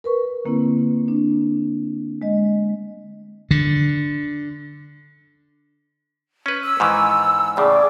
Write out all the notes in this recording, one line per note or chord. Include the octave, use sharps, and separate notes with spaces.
A#4 B4 C#6
D3 A#3 C4 E4
D4
G#3 D#5
D3
C#4 B4
E6
G#2 D#3 E3
A2 C#3 G#4 D5 D6